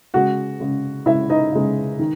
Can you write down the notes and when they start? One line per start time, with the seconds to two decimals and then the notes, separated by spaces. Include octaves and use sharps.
0.14 C#3 G#3 F#4 F#5
0.60 C#3 G#3
1.06 C#3 G#3 E4 E5
1.29 D#4 D#5
1.52 C#3 G#3
1.99 D#3